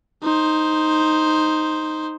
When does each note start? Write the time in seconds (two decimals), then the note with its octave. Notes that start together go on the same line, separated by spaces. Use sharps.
0.22 D#4 C5